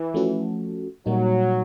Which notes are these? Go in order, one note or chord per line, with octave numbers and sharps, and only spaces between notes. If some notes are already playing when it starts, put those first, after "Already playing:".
Already playing: E3
F3 A3 C#4 F#4 A4
A#2 F#3 G3 A#3 D#4